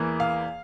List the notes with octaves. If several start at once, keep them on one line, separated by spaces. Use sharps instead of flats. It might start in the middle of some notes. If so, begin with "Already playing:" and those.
Already playing: E2 E3 A#3
F5